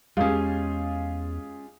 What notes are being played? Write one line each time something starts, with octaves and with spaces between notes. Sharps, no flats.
E2 G#3 C#4 F4 G4 G#4